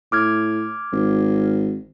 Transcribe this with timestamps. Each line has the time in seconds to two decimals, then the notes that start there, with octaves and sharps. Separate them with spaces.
0.12 A2 D6 F6 G#6
0.92 G#1